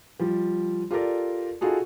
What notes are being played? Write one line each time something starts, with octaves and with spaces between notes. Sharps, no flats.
F3 G3
F4 G4 A4 A#4 D5
D#4 F4 F#4 G#4 A4